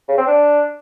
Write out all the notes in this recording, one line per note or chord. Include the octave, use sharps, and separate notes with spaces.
C#3
C4
D4